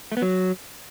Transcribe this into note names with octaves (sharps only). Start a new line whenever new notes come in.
A3
B3
F#3